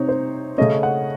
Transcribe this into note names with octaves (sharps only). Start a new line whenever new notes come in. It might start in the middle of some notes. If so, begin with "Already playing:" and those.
Already playing: C3 C4 D#4 C#5
C5
C#3 A3 C#4 D#5
F#5